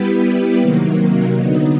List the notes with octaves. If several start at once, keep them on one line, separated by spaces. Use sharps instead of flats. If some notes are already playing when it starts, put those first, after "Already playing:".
Already playing: G3 B3 E4 G4 B4
C3 D#3 F#3 A#3
D3 F#3 B3 D#4